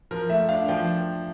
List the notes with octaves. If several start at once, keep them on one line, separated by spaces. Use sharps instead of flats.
F3 A#4
A3 E5
D4 F5
F3 G5